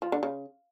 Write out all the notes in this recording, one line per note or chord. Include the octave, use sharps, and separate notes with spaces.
F3
D3
C#3